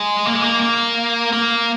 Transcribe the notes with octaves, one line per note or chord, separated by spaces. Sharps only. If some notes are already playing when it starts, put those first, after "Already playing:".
Already playing: G#3
A#3
G#3
A#3
A#3
A#3